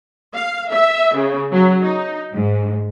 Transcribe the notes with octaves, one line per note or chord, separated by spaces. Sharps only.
F5
E5
C#3
F#3
D#4
G#2